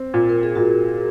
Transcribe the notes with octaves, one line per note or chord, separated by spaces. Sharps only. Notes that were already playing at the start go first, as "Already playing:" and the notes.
Already playing: C4
A#2
A#4
G#4
A#2 F#4